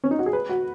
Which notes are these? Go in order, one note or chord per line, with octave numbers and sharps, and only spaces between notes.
C#4
D#4
F#4
G#4
B4
F#4